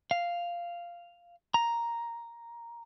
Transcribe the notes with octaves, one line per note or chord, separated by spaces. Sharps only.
F5
A#5